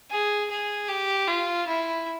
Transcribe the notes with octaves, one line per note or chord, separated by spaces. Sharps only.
G#4
G#4
G4
F4
E4